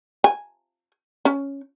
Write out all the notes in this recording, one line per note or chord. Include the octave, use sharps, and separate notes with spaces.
G#5
C#4